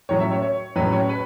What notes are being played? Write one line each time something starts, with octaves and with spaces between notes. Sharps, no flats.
A2 F#3 C#4 C#5
E5
C#5
C#5
A2 F#3 C#4 B4
C#5
B4